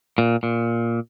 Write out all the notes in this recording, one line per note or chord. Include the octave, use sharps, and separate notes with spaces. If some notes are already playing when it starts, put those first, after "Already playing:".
A#2
A#2